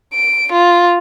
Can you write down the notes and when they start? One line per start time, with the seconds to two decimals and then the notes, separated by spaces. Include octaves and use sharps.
0.14 D7
0.52 F4